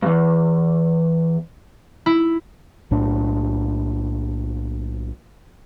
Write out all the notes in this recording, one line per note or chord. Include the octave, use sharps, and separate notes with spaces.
E2 G2
E4
B1 A2 D4